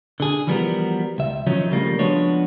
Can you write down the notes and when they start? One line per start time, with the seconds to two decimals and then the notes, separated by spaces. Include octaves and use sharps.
0.20 D3 G#4
0.47 E3 F3 G3 B3 F#4 A#4
1.18 C#2 E5
1.47 D#3 F3 F#3 C#4 D#4
1.71 C#3 F3 G3 A3 A#3
1.99 F3 G#3 B3 D4 F#4 C#5